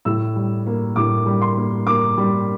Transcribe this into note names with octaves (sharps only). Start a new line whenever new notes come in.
A2 E6
G3
A#3
A2 D6
G3
C6
A#3
A#3 D6
G3